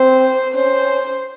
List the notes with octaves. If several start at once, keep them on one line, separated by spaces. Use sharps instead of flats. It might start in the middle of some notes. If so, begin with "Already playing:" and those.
Already playing: C4 C5
C#4 C5